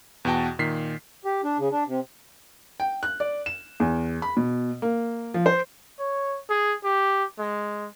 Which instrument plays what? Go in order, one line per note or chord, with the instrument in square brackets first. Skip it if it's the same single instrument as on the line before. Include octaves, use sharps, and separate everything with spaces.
[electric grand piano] E2 B2 F#4 G5 A5
A#2 D#3 B6 C7
[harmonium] G4
D4
C#3
D4
C3
[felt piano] G5
F#6
D5
E7
E2
B5
B2
A#3
F3
C5
[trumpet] C#5
G#4
G4
G#3